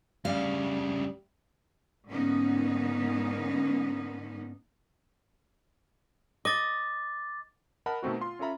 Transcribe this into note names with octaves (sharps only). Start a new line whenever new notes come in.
D2 C#3 G3 F5
G#2 D3 A#3 B3 C#4 D#4
D#5 D6 A6
A#4 D#5 F#5 A5 B5
B2 D#3 A3 C4 F#4
F4 C6
C#4 F4 A4 E5 A#5 B5